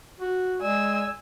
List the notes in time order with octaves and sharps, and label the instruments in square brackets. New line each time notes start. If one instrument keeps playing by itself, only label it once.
[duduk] F#4
[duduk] G#3 [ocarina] D5 [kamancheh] G#5 E6